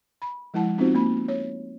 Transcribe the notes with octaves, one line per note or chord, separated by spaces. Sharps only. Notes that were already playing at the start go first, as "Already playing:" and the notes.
B5
F3 G#3 E4 F#5 A5
B3 C4 D#4 F4 F#4 C5
A#3 B5
C#5